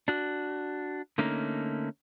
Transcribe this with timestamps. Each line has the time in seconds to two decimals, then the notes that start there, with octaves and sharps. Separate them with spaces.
0.08 D4 F#4
1.18 D3 A3 A#3 C#4 D#4